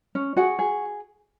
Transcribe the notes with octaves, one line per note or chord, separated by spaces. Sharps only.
C#4
F#4 G#4 F#5
G#4